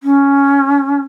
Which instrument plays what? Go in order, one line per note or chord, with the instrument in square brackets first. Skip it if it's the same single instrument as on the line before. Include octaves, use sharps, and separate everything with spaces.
[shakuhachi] C#4